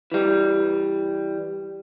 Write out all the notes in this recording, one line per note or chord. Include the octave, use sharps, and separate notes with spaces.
E3 G3